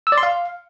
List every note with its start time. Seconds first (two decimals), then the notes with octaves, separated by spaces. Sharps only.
0.07 E6
0.12 D5
0.18 C6
0.23 F5